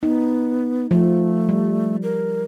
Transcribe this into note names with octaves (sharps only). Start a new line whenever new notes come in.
B3 D#4
F3 A3
G3
A#4